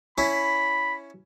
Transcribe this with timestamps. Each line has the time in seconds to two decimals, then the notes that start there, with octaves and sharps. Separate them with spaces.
0.18 C#4 E4 B5